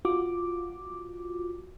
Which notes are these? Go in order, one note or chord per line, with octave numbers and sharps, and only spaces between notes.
F4 F#4 D6